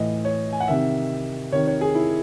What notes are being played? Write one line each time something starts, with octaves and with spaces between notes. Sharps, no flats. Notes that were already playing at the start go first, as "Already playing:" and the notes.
Already playing: A2 E3 D#5
C#5
G#5
F#5
C3 D#3 E5
C3 D#3 C#5
C#5
G#4
E4